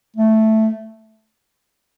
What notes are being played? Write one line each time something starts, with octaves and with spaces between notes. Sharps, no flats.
A3